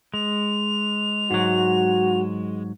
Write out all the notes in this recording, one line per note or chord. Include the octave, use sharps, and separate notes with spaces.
G#3 F7
G#2 F#3 F#4